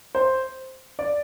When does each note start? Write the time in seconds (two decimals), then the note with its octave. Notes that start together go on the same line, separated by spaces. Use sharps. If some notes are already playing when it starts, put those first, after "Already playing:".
0.15 C5
0.99 D5